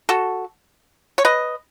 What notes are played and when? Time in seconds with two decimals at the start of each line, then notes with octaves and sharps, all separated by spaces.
0.09 F#4 A4
1.18 C#5
1.25 B4 D#5